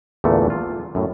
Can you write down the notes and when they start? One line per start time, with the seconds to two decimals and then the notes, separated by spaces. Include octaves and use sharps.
0.24 E2 A#2 D3 E3 A3
0.50 F4
0.95 F#2 A2